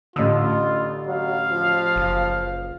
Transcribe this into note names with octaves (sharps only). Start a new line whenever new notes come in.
A1 A2 D3 F4 E6
F#3 F5
F3
F#1